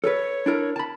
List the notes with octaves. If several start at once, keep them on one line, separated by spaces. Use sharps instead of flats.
A4 B4 C#5
D4 E4 A#4
A5 B5